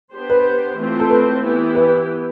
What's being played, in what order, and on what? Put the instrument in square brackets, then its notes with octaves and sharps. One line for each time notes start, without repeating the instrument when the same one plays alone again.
[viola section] B3 D4 G4 C5
[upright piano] B4
[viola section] E3 A3 C4 F4 C5
[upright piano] A4
B4
[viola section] E3 B3 E4 G4
[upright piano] B4